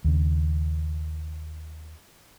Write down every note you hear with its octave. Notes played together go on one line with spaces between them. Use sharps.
D#2 C#3